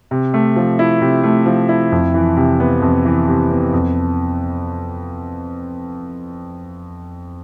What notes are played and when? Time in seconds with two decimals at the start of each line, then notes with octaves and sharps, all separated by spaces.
0.11 C3
0.34 A3
0.56 F3
0.79 E4
1.01 C3
1.24 A3
1.46 F3
1.69 E4
1.92 F2
2.14 E3
2.37 C3
2.60 B3
2.82 F2
3.05 E3
3.27 C3
3.51 B3
3.73 F2